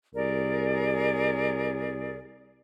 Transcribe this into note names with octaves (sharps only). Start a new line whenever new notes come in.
C2 G#4 A#4 D5